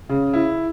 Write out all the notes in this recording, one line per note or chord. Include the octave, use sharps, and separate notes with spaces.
C#3
E4